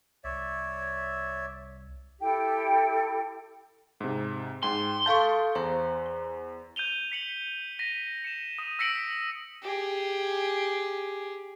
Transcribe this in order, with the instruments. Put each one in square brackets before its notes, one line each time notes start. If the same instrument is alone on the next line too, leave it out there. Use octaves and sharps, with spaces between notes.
[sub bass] C2 [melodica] C#5 D5 E5
[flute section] E4 G4 A4 G5
[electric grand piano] G#2 C3
[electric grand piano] G#2 G5 [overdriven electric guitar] C6
[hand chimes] A4 F5 G6 [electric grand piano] A5 C#6
[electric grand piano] E2 [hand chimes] C5 A#5
[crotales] G6 D#7 F7 G7
B6 C#7 F#7
A#6 B6 D#7
C#7 E7
D#6 D#7
E6 A#6 B6 C#7 D7 F#7
[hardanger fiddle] G4 G#4